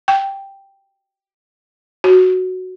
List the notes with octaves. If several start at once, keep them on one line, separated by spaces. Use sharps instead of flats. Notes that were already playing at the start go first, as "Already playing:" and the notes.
G5
F#4